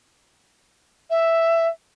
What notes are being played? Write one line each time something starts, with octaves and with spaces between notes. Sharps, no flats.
E5